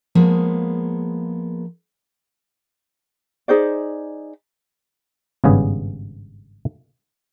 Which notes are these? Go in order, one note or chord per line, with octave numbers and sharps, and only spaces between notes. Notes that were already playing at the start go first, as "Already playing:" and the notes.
F3 G#3 A#3 B3 G#4
D#4 G#4 C5 D5
G#1 G2 C#3 B3 G#4